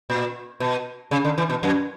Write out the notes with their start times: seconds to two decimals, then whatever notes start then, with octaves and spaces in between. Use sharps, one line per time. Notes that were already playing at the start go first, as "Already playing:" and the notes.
0.10 A#2
0.60 B2
1.11 C#3
1.25 D3
1.38 E3
1.50 B2
1.63 F#2